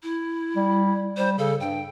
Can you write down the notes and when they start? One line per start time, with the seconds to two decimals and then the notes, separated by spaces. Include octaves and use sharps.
0.03 E4
0.56 G3
1.17 G3 C5
1.38 C#3 A4
1.60 G2 G5